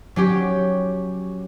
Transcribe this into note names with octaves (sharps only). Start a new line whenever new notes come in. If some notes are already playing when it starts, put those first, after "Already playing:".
F#3 C#4 G4